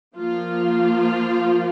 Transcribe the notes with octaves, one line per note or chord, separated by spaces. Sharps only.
F3 A#3 F4